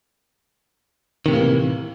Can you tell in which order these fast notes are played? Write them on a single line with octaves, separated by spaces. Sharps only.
D#3 C3 A2 A#3 E3